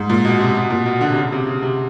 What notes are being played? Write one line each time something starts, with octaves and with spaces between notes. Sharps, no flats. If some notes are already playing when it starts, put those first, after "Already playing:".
Already playing: G#2
A#2
B2
C3
B2
A#2
B2
D3
C3
C#3
C3
C#3
C3